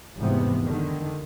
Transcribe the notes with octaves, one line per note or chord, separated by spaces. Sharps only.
F1 E2 G#2 C3 B3
D3 D#3